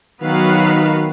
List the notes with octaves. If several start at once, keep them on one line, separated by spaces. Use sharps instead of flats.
D#3 F#3 B3 F#4 B4 F5